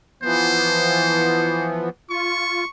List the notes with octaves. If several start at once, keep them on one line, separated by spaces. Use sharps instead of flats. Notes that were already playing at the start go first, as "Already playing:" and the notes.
E3 F3 B3 C5
F4 C#6